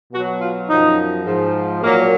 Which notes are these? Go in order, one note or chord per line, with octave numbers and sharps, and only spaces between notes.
B2 F#3 F#4
F4
F#2 F3 D#4
G#2 F3
A#2 F#3 A#3